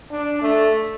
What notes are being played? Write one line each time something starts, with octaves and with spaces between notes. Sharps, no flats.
D4
A3